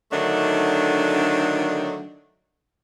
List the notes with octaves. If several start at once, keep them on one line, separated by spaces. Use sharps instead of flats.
D3 D#3 F#3 A3 D4 D#4